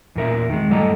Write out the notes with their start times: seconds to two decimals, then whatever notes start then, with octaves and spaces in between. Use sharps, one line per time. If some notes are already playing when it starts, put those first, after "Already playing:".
0.15 E2 A#2 A#4 E5
0.49 D#3 G#3
0.69 F#2 A2 G3 A4 D#5 A#5